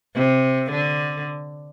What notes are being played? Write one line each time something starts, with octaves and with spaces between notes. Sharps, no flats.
C3
D3